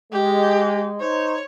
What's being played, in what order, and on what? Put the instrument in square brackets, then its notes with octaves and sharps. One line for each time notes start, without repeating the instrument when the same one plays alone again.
[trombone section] G#3 [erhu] G4
[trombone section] D#4 C5 [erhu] C#5